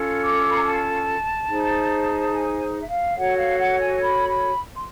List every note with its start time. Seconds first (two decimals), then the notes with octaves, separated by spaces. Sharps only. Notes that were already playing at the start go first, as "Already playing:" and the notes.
Already playing: C#4 F4 A4
0.22 D6
0.50 B5
0.57 A#5
0.64 A5
1.48 D#4 G#4 C5
2.32 G#5
2.80 E5
2.88 F5
3.16 F#4 A4 C#5 F#5
3.37 F5
3.57 F#5
3.79 G#5
4.00 B5
4.28 B5
4.74 C6